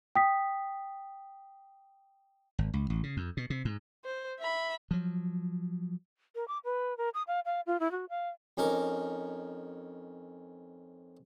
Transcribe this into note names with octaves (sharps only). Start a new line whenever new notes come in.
G5 D#6 B6
G#1
C#2
A1
C#3
F2
B2
C3
G#2
C5
E5 B5
F3 F#3
A#4
D6
B4
A#4
D#6
F5
F5
F4
E4
F#4
F5
F2 C#4 D#4 A#4 D6